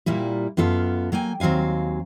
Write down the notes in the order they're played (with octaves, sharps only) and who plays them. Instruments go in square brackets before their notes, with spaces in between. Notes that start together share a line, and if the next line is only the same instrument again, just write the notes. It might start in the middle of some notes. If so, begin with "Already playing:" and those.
[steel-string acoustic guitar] A#2 G3 A#3 E4
F#2 B3 F4 A4 F5
F#3 A#3 G5 G#5
D#2 F#3 C4 F5 G#5